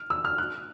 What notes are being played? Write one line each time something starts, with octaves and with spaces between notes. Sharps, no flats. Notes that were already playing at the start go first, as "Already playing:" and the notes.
Already playing: F6
E6
F6
F#6